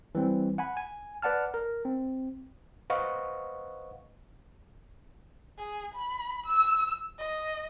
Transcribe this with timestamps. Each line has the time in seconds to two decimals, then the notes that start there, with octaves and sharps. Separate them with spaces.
0.15 E3 G3 C4
0.58 F#5 G#5 B5
0.77 G#5
1.22 B4 D5 F#5 A5 F6
1.54 A#4
1.85 C4
2.90 B4 C5 D#5 F5 F#5 C#6
5.58 G#4
5.94 B5
6.46 E6
7.18 D#5